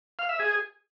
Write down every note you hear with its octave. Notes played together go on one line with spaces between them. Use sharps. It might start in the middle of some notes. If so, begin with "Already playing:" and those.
F5
E5
G#4